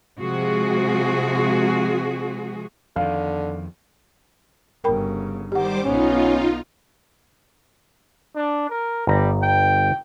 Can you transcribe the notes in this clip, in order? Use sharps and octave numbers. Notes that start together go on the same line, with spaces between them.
C3 F3 G#3 F#4 G#4
F2 D3 D#3 F5
G1 C#3 A#4 G5 B5
D#3 G3 G4 C5 F#5 D6
B1 B3 C#4 D#4 F4
D4
A#4
G1 G3 A#5
G5